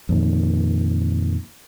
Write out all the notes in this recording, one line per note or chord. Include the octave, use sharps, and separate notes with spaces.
F2 A#2 D#3